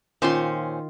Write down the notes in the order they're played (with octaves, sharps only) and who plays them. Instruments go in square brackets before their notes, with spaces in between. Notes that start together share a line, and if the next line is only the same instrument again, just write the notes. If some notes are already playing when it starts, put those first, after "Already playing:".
[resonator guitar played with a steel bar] A#2 C#4 C5 [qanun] D#3 F4 C6